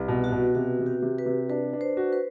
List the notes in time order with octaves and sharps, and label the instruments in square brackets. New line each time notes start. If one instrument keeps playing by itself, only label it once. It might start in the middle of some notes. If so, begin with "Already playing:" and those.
Already playing: [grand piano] C2 [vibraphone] B4
[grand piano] B2
[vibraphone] F#4
[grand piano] B2
[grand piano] C3 [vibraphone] F#4
[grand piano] C3
[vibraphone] G4
[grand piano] C3
[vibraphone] B4
[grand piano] C3
[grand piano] D4 [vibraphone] B4
[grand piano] D4
[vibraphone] C5
[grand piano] F#4
[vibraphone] B4